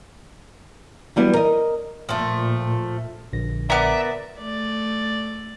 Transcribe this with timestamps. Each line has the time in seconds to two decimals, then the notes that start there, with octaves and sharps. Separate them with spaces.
1.16 E3 F#3 G3 B3 E4
1.34 A#4 D#5
2.09 A#2 F3 A3
3.33 A#1 D3 A#6
3.70 B3 A#4 D5 E5
4.39 A3 D5